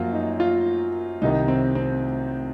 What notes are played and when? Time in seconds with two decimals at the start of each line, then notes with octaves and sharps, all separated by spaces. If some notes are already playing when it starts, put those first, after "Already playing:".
Already playing: F#2 F3 A#3 F4 F#4
0.13 D#4
0.40 F4
1.21 C2 C3 D#3 D#4
1.48 C4
1.75 C4